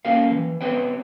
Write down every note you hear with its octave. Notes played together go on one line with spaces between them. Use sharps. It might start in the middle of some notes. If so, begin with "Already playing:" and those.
A#3 C#4 F4 G4 A#4 F5
E3
B3 C4 G4 B4 C#5 G5